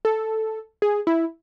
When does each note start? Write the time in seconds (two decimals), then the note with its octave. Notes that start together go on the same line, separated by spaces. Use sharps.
0.05 A4
0.82 G#4
1.07 E4